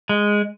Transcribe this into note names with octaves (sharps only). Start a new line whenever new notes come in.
G#3